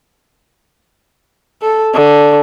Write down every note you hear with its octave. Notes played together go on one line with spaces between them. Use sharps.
A4
D3